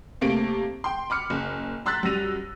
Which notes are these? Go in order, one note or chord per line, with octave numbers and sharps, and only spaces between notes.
C3 A3 A#3 D7
G5 C6
B5 D6 F6 C#7
F#1
A#5 C6 E6 F#6 A6 B6
F#2 G3 A#6 D#7 F7